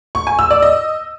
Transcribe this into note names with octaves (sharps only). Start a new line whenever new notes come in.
C#6
G#5
E6
D5
D#5